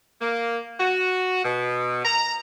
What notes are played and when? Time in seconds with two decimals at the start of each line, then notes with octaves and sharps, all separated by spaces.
0.22 A#3
0.80 F#4
1.44 B2
2.05 A#5